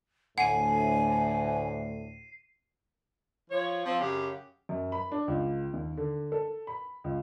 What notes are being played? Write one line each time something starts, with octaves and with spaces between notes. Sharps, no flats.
D2 A2 F#5 G#5 C7 D#7
F3 C#5
F3 C4
F#2 C#3 G4
F#2
B5
D4
C#2
D#2
D3
A4
B5
C#2